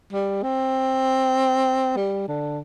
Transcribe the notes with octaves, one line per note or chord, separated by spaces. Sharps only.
G3
C4
G3
D3